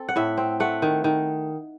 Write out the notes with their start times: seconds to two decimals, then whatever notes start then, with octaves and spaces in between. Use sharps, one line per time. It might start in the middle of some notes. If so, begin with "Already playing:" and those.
Already playing: C4 A4
0.09 F#5
0.16 A2 E5
0.37 C4
0.60 A3 F#5
0.82 D#3
1.04 D#3